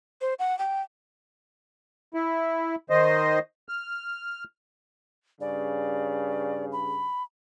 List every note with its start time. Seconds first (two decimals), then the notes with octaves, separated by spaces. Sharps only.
0.21 C5
0.39 F#5
0.59 G5
2.14 E4
2.90 D#3 C5 D#5
3.69 F6
5.41 G2 C#3 D5
6.72 B5